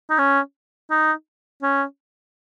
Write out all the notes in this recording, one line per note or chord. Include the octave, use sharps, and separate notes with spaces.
D#4
C#4
D#4
C#4